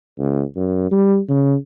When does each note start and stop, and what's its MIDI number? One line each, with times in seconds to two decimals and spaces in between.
0.19 0.43 37
0.56 0.88 42
0.91 1.19 55
1.29 1.55 49